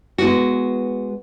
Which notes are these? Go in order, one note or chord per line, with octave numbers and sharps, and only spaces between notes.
G#3 B3 F#4